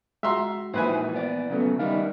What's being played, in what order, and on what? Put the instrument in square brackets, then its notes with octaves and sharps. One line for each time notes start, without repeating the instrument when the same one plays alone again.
[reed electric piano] G#3 F#4 [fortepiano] E5 A#5 C6
[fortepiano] A#1 B4 G#5 [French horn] E3 [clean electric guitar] D#4 E4 C5
[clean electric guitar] B3 D5
[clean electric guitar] C#3 F#3 A3 [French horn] B3
[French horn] D#3 [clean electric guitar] G3 D4 E4 [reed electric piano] F5